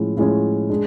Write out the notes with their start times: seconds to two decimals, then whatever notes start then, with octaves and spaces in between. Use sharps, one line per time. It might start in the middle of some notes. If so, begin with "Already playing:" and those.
Already playing: A2 F3 G#3 C#4
0.17 A2 F3 G#3 C#4
0.70 G#3 D4